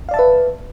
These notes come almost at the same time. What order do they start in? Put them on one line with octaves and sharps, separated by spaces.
F5 D5 A5 E5 B4